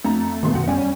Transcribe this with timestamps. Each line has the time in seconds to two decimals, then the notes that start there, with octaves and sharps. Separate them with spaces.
0.04 F2 A3 A#5
0.43 B1 B2 D#3 E3 G#3 B3 C6
0.55 F#2 B2 D#3 F#5
0.67 G3 C#4 D5 G#5